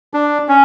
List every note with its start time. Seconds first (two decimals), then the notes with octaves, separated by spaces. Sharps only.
0.14 D4
0.49 C#4